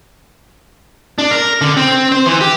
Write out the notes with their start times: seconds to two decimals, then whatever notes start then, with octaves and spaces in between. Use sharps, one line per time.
1.18 D4
1.31 A#4
1.61 D3
1.77 C4
2.12 C5
2.26 E3
2.41 G4